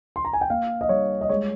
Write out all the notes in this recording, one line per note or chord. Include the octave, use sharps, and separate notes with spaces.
C6
A#5
G#5
G5
A#3 F5
D#5
G3 C#5
D#5
G#3 C#5